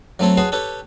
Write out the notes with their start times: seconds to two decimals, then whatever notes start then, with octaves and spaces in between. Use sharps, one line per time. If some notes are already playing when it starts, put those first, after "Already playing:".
0.19 F#3 A3 C4 A4 C#5
0.37 F#4 G#4 B4 C#5 A5 C6
0.52 G4 A4 B4 C#5